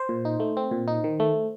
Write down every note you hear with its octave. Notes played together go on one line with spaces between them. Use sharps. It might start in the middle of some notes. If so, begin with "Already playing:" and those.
Already playing: C5
A#2
D#4
A3
C4
A#2
D#4
D#3
A3